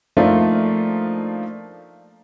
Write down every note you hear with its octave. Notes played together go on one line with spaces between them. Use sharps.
F3 A3 A#3 D4 D#4 F4